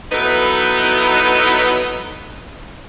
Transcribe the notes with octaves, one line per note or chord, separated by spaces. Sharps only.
F#3 B3 D#4 E4 A4 B4